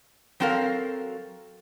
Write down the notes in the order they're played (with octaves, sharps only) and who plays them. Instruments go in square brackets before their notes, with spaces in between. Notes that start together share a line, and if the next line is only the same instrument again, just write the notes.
[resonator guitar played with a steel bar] F#3 C4 F#4 A4 A#4 F5